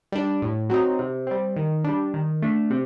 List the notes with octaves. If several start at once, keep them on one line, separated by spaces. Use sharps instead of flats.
G3 D4
A2
F#3 C4 D#4
C3
G3 C4
D#3
G3 D4
D#3
A3 D4
C3